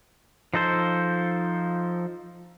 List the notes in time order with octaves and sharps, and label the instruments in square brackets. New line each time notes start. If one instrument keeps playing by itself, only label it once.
[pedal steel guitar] F3 D#4 A4 C5